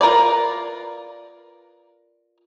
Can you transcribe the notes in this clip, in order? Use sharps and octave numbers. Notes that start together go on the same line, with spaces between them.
F4 A#4 B4 D5